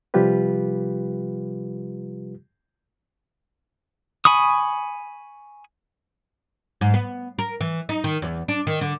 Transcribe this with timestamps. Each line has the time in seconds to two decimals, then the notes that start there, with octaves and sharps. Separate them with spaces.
0.14 C3 F3 G3 F4 G4 B4
4.25 G#5 B5 C#6 D#6
6.81 G#2
6.94 B3
7.38 A#4
7.61 E3
7.89 D#4
8.04 D#3
8.22 E2
8.48 D4
8.67 D#3
8.81 D3